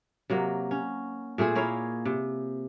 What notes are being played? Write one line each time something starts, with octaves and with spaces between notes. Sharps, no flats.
C3 F#3 A#3
C#4
A#2 A3 C4 G#4
A#3 E4 C#5 F5
C3